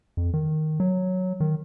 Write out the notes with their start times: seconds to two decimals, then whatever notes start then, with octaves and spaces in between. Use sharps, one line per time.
0.17 F2
0.34 D#3
0.80 F#3
1.40 D#3